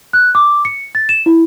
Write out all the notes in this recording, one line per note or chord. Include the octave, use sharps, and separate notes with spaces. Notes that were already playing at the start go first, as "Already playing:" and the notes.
F#6
D6
C#7
A6
E7
E4